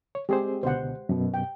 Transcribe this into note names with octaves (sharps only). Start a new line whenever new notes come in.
C#5
G#3 C4 G4 G#4 C5
C#2 B2 D3 C5 F#5
F#2 B2
G5